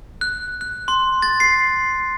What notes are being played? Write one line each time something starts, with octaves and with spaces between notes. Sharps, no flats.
F#6
F#6
C6
A6
C7